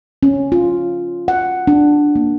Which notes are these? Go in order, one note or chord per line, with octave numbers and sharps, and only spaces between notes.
C#4
F4
F#5
D4
A#3